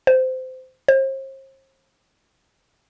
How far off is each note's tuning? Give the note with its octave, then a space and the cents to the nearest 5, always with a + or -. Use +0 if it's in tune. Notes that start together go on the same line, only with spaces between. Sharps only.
C5 -20
C5 +40